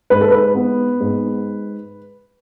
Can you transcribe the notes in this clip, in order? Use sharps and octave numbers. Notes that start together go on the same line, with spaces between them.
G#2 B4
A4
B4
B3
G#2